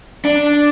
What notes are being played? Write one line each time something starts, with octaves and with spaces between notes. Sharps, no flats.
D4